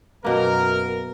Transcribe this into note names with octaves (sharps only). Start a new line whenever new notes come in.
F#2 B2 A#3 A#4